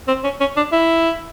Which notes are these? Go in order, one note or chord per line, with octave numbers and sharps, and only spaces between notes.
C4
C#4
C#4
D4
E4